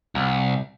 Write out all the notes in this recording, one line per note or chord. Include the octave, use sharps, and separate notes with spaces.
C2